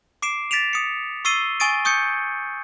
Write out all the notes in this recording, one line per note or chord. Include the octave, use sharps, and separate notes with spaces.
D6 C7 D7 E7
A6 B6 D7 E7 F7
D#6 C#7
C#6 E6 A6 C7 D#7 G7
G#5 C#6 D#6 A6 D7 D#7
C#6 D#6 G6 G#6 C#7